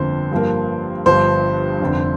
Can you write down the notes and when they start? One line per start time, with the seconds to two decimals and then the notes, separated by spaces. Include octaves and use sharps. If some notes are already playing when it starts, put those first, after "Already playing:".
Already playing: G1 F2 D3 F3 A#3 C5
0.32 G2 F3 A#3
1.06 G1 G2 F3 C5
1.80 F1 F2 D3